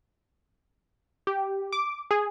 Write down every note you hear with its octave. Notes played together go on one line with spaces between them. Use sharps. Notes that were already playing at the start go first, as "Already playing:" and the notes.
G4
D6
G#4